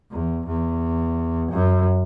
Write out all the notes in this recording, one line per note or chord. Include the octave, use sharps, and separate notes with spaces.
E2
E2
F#2